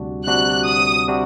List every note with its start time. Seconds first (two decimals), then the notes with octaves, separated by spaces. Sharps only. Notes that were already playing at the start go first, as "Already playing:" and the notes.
Already playing: D2 C3 G3 D4 F#4
0.26 D2 C3 G3 D4 F#4 F#6
0.67 D#6
1.08 C3 G3 D4 F#4